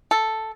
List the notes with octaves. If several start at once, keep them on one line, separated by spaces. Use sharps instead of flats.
A4